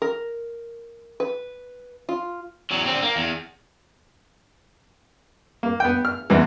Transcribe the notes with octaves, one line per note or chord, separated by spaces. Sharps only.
A#4
B4
F4
E2 F#3
D3 C4
A#3
E2
A#3
B3 G5
F6
E2 G#2 E3